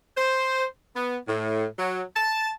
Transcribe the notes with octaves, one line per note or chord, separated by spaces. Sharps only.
C5
B3
A2
F#3
A5